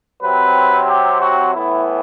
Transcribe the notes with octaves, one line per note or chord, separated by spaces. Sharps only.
C3 F#3 C4 B4
G4
F#4
A2 E3 B3 E4